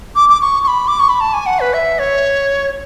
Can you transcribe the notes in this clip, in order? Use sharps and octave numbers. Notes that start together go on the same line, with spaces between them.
D6
D6
C#6
C#6
B5
D6
C#6
B5
A5
G#5
F#5
B4
E5
C#5